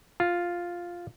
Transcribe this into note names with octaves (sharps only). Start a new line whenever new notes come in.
F4